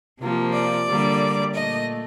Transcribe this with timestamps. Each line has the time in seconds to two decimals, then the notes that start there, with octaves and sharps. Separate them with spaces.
0.20 C3 F3 A#3
0.54 D5
0.87 D3 G3 A#3
1.55 A#2 A3 D#5